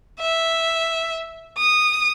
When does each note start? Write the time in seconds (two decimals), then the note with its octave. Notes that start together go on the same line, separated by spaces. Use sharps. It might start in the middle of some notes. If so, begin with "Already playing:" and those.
0.21 E5
1.58 D#6